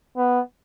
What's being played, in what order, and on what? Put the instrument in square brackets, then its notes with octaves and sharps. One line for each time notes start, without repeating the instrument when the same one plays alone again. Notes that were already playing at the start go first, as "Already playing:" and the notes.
[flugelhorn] B3